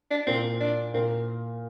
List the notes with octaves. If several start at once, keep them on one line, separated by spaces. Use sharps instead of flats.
D4
A#2 A#3 C4
D4
A#2 A#3 C4